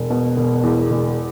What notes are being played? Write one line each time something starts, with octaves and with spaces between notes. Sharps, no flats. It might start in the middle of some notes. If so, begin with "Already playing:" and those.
Already playing: E1
B2
E1
E2
E1